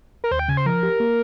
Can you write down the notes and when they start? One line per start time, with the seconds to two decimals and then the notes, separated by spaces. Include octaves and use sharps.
0.24 A#4
0.31 D#2 C5
0.39 G5
0.48 C#3 G#5
0.57 C5
0.66 F3 A#4
0.83 G4
1.00 A#3